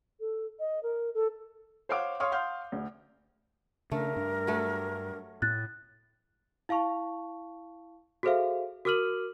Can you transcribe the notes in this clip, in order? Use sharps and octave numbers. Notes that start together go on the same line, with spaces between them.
A4
D#5
A#4
A4
C5 C#5 F5 F#5 D6
C#5 F5 C6 C#6 D#6 F6
F5 F#5 C6 F6 G6
D2
C#3 A3 D4 A#4
G2 D4
F#3 A3
A2 F#6 A6
E4 F5 A5 C#6 F7
F#4 G#4 A4 C5 E5 F5
F#4 A#4 D6 F6 D#7 F#7